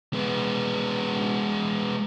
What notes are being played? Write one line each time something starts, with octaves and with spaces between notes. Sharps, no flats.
G#3 B3